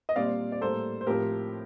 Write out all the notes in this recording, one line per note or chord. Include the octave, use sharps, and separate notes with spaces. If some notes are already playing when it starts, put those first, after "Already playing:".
D#5
A#2 G3 C4 D5 F5
D5
A2 G3 A#3 A4 C5
C5
A2 F3 C4 G4 A#4